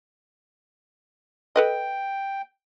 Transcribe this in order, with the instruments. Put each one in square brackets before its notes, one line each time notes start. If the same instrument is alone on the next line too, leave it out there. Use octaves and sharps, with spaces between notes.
[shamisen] A4 B4 D#5 [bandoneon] G5